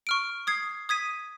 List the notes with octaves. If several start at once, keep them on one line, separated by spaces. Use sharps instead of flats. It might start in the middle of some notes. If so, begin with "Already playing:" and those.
C#6 F6 D7
D#6 G#6 C7
D#6 G#6 B6 D#7